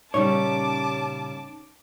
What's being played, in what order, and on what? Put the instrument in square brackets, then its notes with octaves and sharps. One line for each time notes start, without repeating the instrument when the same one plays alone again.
[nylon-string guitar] A#2 C#3 G3 [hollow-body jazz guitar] C#4 D#4 C#5 [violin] A5 D6